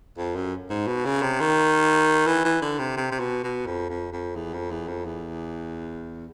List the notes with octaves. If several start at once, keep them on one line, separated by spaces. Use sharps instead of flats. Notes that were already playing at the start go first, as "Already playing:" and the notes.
F2
F#2
G#2
B2
C#3
C3
D#3
E3
E3
D3
C3
C3
C3
B2
B2
F2
F2
F2
E2
F2
E2
F2
E2